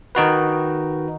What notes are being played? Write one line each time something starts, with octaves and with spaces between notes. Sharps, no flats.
D#3 D#4 F#4 B4